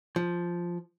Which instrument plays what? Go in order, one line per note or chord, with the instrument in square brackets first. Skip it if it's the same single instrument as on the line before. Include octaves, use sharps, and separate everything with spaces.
[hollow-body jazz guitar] F3